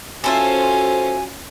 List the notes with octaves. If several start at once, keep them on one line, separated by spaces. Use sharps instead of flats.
C#4 F4 F#4 A4 C5 E5 G#5